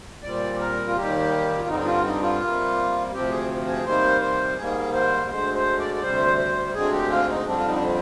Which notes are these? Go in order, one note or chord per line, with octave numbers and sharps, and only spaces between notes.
A#2 G3 C4 D5
A#4
F4
D#2 D#3 G3 A#3 G4
F4
G2 D3 G3 C4 D#4
D#4
F4
D#4
F4
C3 G3 A#3
D2 C3 F3 C4 G4
G#4
G#4
C3 D#3 G3 A#3 C5
C5
G#2 D#3 G3 A#3 G#4
C5
D2 D3 G#3 C5
C5
D5
D5
D2 C3 G3 C5
C5
D2 D3 G#3 C4 G#4
G4
F4
D#4
F2 D3 G3 C4 D4
F4
D#4
D4
C4